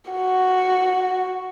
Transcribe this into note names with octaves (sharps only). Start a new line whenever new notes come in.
F#4